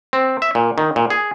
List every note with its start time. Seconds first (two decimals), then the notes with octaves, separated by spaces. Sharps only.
0.13 C4
0.42 E5
0.55 A#2
0.78 D#3
0.96 A#2
1.10 G#4